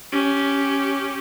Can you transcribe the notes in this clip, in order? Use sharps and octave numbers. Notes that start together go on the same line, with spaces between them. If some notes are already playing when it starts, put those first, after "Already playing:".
C#4 G4